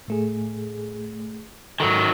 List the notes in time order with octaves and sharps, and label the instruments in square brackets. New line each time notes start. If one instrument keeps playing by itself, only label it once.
[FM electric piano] A2 A3 G#4
[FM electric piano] G#2 A4 [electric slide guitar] D#3 F#3